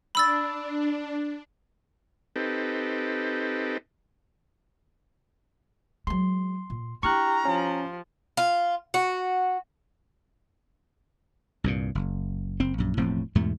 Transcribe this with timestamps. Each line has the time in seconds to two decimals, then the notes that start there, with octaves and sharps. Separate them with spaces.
0.15 D4 B5 E6 A6
2.36 C4 D#4 G4 A4 B4
6.07 F#3 G#3 C6
6.70 A#2
7.03 D4 E4 G4 A#5 C#6 F6 F#6
7.45 F3 C#4
8.37 F4
8.94 F#4
11.64 C2 G2 A#2
11.95 F#1
12.60 F#1 C4
12.78 A#1 F#2
12.97 E1 A2 F3 C4
13.35 E2 G#2 B2 A3